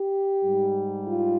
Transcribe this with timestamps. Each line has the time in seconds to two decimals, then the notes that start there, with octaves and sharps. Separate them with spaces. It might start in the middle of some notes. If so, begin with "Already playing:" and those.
Already playing: G4
0.43 G#2 G3
1.06 F4